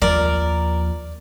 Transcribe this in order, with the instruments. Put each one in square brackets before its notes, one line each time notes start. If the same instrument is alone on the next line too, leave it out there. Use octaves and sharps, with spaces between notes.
[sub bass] D#2 [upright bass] F3 [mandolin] A#4 [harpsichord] D5